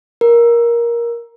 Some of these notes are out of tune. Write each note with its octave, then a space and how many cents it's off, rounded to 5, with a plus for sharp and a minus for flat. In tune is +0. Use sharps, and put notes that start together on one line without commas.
A#4 +15